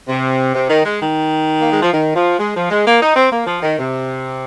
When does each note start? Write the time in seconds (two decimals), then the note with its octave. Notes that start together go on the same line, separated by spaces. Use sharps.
0.08 C3
0.55 C3
0.70 D#3
0.85 G#3
1.01 D#3
1.61 A#3
1.72 G#3
1.82 F3
1.93 D#3
2.15 F3
2.39 G#3
2.55 F3
2.70 G#3
2.85 A#3
3.01 D#4
3.16 C4
3.32 A#3
3.46 F3
3.62 D#3
3.78 C3